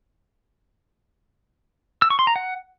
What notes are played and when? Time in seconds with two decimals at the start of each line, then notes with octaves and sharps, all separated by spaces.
2.02 E6
2.10 C#6
2.19 C6
2.27 A#5
2.36 F#5